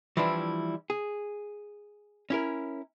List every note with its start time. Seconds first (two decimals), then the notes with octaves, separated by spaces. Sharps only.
0.17 E3 F3 G3 D4 E4
0.90 G#4
2.30 C#4 E4 A#4